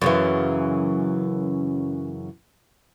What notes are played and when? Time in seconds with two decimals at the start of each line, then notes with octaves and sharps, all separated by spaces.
0.02 F#2 C#3 E3